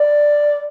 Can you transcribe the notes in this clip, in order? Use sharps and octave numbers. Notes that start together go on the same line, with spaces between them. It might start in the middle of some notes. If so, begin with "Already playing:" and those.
Already playing: D5